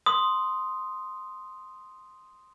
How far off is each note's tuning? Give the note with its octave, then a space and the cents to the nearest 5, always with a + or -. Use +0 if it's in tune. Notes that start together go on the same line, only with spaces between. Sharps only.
C6 +0 D#6 +0